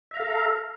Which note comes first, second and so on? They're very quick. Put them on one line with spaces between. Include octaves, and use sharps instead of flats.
E5 A#5 F5 A4